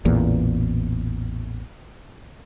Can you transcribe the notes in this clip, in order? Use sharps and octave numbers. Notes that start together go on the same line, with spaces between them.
A1 E2 A#2